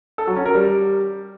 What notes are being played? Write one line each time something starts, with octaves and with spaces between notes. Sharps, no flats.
A4
F#3
C#4
A#4
G3